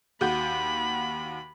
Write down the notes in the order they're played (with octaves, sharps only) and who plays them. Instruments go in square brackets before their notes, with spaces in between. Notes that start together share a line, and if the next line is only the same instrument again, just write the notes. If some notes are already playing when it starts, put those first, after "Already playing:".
[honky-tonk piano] D#2 F#4 G6 [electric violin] B5